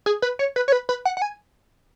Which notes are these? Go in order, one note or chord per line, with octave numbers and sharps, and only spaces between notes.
G#4
B4
C#5
B4
C#5
B4
B4
F#5
F#5
G#5